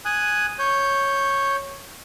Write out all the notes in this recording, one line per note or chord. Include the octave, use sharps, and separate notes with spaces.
G#5 D#6 F#6
C#5 G6